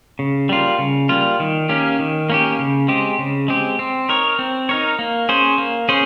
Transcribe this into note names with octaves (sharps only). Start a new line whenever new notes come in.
C#3
G3 A#3 F4
C#3
G3 A#3 F4
D#3
A#3 C#4 G4
D#3
A#3 C#4 G4
C#3
G#3 C4 G4
C#3
G#3 C4 G4
C4
D#4 A#4 C#5
C4
D#4 A#4 C#5
A#3
C#4 G#4 C5
A#3
C#4 G#4 C5